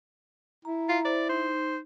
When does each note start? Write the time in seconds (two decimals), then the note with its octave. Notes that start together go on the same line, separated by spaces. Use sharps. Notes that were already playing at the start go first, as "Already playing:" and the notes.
0.65 E4 A#5
0.89 F4
1.05 C5 D5
1.29 D#4 C5